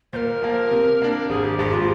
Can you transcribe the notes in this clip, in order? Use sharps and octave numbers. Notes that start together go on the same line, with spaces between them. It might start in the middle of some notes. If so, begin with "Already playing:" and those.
A#2 A#4 C5
F3 A#3
C3
G3 A#3 D4
G#1 G#4
G4
G2 F3 G#3 G4
F4